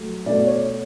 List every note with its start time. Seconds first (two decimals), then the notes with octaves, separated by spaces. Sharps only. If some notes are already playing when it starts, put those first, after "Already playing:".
Already playing: F#3 A3
0.26 B2 A3 D5
0.46 C#5